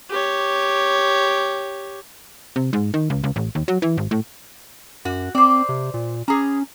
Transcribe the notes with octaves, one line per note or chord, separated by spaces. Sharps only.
G4 C#5
C3
G#2
D#3
C#2
C#2
A1
D#2
F#3
E3
G#1
A2
F#2 F#4
C4 C5 D5
C3
A#2
C#4 G#4 A#5